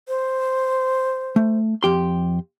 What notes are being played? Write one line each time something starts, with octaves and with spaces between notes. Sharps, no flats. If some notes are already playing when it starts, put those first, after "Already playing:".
C5
A3
F2 G4 C6